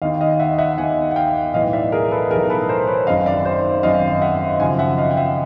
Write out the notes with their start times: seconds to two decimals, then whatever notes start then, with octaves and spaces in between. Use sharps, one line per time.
0.02 D#2 D#5 F5
0.05 D#3
0.20 D#5 F5
0.40 E5 F#5
0.58 E5 F#5
0.78 D#2 D#3 F#5 G#5
1.11 F#5
1.16 F5 G5
1.54 B1 A2 E3 D#5 F5
1.73 D5 E5
1.92 G#4 A#4
2.11 A4 B4
2.30 B1 A2 E3 G#4 A#4
2.50 A4 B4
2.69 A#4 C5
2.88 B4 C#5
3.07 G#1 F#2 D#3 D#5 F5
3.26 D5 E5
3.45 C5 D5
3.83 G#1 F#2 D#3 D#5 F5
4.21 E5 F#5
4.60 G#1 F#2 C#3 F3 F#5 G#5
4.79 E5 F#5
4.98 D#5 F5
5.11 G5
5.17 E5 F#5